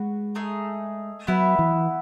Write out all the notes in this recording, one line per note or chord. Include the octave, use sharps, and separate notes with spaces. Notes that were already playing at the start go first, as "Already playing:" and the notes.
Already playing: G#3 F#4 B4
A3 D#4 G#4
F#3 B3 E4 B4 E5
E3